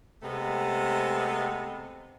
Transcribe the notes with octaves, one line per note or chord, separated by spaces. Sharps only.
C3 G#3 A3 B3